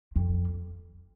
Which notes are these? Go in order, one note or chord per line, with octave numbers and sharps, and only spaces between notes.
F2